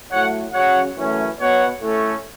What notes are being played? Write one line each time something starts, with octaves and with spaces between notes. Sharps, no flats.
A2 F#3 A3 C#5 F#5
C#3 F#3 C#4 C#5 F#5
F#2 E3 A3 C#4
B2 B3 C#5 F#5
A2 A3 C#4